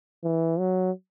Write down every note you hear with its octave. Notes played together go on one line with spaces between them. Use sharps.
E3
F#3